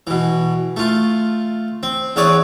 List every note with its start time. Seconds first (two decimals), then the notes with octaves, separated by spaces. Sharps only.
0.07 B2 E3
0.77 A3 F4
1.83 C4
2.16 E2 C4 B4 C#5 D5 D#6